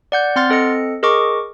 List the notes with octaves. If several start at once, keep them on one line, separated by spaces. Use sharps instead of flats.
D5 F#5 G6
C4 F#5 C6 F6 A6
C4 A4 D#5 C#7
G#4 A#4 D#5 C#6 D6